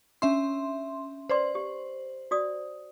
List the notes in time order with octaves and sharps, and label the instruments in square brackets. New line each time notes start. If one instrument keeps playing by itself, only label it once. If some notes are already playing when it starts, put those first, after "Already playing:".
[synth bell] C#4 E5 C6 [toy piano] D4
[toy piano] B4 D5 C6 [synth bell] C5
[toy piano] G4
F#4 D5 D#6